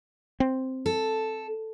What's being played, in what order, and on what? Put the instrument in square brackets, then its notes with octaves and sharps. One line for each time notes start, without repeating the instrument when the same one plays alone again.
[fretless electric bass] C4
[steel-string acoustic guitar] A4